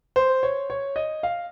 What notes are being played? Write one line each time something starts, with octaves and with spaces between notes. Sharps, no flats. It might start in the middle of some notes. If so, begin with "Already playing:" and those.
C5
C#5
C#5
D#5
F5